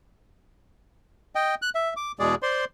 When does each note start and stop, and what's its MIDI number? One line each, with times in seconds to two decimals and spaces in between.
1.35 1.55 75
1.35 1.55 79
1.62 1.70 90
1.75 1.94 76
1.96 2.12 86
2.19 2.35 40
2.19 2.35 47
2.19 2.35 56
2.19 2.35 68
2.19 2.35 74
2.42 2.65 72
2.42 2.65 74
2.42 2.65 84